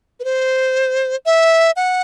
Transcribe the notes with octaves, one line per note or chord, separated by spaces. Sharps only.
B4
C5
E5
F#5